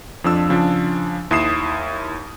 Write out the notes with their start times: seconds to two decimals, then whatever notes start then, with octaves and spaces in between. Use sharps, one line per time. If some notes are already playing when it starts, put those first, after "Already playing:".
0.24 F2 F3 D4 E6
0.49 C#3 F3 D4
1.31 D#2 E4 D#6 C7 E7